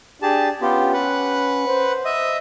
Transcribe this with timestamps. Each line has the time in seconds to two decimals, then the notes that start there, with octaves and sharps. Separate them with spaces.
0.22 D4 G4 G#4 A5
0.61 B3 C#4 F4 G4
0.93 B4 F#5
1.68 C5
2.05 D#5 E5 D#6